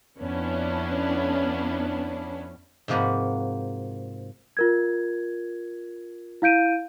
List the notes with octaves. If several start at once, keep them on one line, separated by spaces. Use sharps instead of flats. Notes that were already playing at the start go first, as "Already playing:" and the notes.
F2 B3 C#4 D4 E4
G#2 C3 F3 A#3 F#4 B4
F4 A#4 G#6
E4 F5 G6 D7 D#7